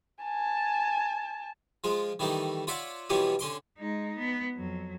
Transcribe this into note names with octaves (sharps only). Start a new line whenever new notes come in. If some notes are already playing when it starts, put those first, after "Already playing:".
G#5 A5
F3 G#3 F4
D#3 E3 G3 A3 D#4
F4 C#5 D5 E5 F#5
B2 E3 F3 G3 B3 C#4
D3 C#4 C6 D6
G#3 D#4
B3
F2 F#3